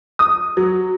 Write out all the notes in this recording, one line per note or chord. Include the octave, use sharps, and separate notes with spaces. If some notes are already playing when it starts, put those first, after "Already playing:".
D#6
F#3